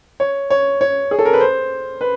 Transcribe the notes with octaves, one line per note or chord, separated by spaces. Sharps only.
C#5
C#5
C#5
G#4
A4
A#4
B4
C5
B4